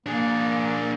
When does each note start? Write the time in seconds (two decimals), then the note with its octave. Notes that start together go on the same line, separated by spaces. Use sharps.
0.06 A#3 D4 G#4